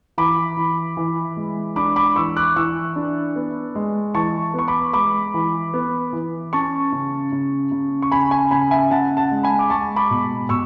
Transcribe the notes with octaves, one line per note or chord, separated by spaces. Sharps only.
E3 B5 D6
E3
E3
G#3
D4 B5 D6
B5 D6
E3 C#6 E6
D6 F#6
E3 C#6 E6
D4
B3
G#3
E3 A5 C#6
B3 C#6
B5 D6
G#3 B5 D6
E3
B3
E3
C#4 A5 C#6
C#3
C#3
C#3
C#6
C#3 G#5 B5
G#5 B5
C#3 G#5 B5
E5 G#5
C#3 F#5 A5
F#5 A5
G#3
G#5 B5
D6
G#3 A5 C#6
B5 D6
B2
B2 C#6 E6